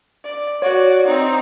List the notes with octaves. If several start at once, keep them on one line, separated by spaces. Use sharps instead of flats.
D5
F#4 C#5 D5
C4 D#4